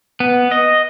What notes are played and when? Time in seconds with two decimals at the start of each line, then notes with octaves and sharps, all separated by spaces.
0.20 B3
0.51 D#5